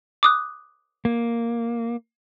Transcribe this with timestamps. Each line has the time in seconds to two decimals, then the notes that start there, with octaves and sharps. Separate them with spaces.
0.23 D6 D#6 F#6
1.05 A#3